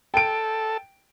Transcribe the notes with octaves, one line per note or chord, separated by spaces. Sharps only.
A4 G5 D7